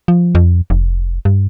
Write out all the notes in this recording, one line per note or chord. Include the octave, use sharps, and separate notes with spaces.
F3
F2
F1
G2